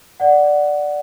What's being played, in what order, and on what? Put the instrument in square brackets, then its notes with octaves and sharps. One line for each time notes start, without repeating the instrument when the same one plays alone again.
[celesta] D5 F#5